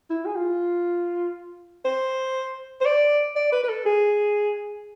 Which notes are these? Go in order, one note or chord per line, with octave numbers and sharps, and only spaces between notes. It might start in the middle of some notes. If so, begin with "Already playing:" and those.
E4
G#4
F4
C5
C5
D5
D5
B4
B4
A4
G#4